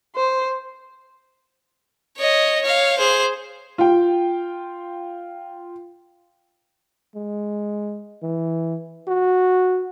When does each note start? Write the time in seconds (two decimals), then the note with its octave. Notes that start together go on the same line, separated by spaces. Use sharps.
0.15 C5
2.18 C#5 D#5
2.62 C#5 F5
2.98 G#4 C5
3.78 F4 G5
7.15 G#3
8.23 E3
9.08 F#4